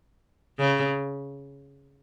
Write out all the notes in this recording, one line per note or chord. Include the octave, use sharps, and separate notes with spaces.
C#3